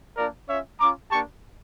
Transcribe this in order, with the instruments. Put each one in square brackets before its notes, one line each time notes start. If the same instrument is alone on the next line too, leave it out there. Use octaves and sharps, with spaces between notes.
[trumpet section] A#3 D4 F4 A#4 D5
C#4 F4 C#5 E5
C#4 F4 A#5 D6
A#3 D4 G4 A5 C#6